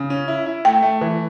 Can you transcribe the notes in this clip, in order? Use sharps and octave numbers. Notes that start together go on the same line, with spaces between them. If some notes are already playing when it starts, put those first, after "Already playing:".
Already playing: C#3
C#4
E4
E4
A3 G5
A3
E3